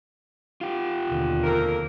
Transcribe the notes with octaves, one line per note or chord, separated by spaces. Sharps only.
F4 G4
D#2 B2 D3
F2 A#3 A#4